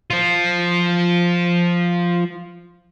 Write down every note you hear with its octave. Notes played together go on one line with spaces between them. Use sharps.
F3 F4